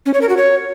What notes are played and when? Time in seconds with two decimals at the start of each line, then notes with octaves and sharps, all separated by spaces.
0.06 C#4
0.14 C#5
0.21 A#4
0.29 F#4
0.37 C#5